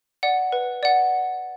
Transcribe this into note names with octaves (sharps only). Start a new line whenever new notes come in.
D5 F#5
B4
D5 F#5